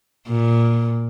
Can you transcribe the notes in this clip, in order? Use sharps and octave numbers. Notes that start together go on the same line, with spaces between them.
A#2